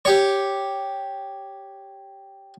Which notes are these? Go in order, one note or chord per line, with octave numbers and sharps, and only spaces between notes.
G4 C#5